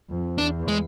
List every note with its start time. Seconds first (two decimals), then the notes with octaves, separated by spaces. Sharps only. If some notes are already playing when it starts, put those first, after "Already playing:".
0.10 F2
0.38 E2 D4
0.68 G#3